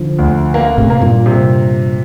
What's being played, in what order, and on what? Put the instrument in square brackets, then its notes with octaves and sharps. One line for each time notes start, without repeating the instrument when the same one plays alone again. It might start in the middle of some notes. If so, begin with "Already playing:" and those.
Already playing: [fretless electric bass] D3 F3
[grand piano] D2
A#3
[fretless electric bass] A2 C3
[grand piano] A#3
[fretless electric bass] G2 A#2
[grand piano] C3